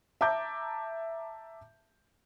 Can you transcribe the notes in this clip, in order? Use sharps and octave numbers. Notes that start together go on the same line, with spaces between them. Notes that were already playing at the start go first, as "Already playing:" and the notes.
E5 A5 A#5 D6 G6